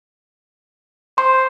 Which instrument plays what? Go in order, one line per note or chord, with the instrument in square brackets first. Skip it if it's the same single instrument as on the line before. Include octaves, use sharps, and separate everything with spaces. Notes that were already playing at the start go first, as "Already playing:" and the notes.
[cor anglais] C5 [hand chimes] C6